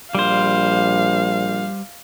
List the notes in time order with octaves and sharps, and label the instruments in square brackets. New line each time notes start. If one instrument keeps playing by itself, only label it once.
[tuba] A#1 [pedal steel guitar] G3 C5 [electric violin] F5